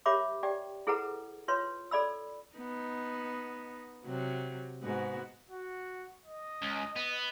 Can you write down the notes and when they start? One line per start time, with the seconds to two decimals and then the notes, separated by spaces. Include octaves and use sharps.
0.06 G4 A#4 C#5 E5 B5 D6
0.43 G4 D5 G5
0.87 E4 G#4 A4 B4 F#5 A#5
1.48 F4 B4 C#5 C6
1.91 A4 D5 B5 E6
2.57 B3 D#4
4.05 C3 F#3
4.83 G#2 B3 F#4
5.50 F#4
6.25 D#5
6.62 C#2
6.96 B3